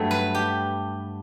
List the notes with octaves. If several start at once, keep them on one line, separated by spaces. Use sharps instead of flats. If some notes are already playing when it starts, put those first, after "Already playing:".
Already playing: G2 F#3 A3 C#5
B4
G4